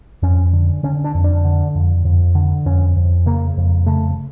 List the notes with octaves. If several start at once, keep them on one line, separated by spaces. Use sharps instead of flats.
F2 C#4
D3
D3 C#4
D4
F2
D4
D3
F2
F2
D3
F2 C#4
F2
C#3 A#3
F2
C#3 A3